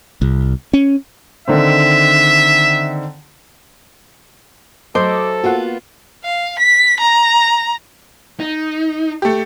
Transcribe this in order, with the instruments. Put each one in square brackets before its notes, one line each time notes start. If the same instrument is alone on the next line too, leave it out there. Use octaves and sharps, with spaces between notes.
[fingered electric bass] C2
C#4
[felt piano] D3 D#3 C4 [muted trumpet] E5
[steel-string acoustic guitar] F#3 A3 [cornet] A4 [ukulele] C5 [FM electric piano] D#5 D6
[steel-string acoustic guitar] A#3 B3 F4 [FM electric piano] F#4 F#5
[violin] F5
B6
A#5
[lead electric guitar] D#4
[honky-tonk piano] A3 G4